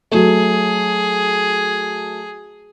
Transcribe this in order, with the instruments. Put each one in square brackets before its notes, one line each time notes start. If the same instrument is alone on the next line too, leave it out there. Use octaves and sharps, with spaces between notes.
[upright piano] F#3 A3 [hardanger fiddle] G#4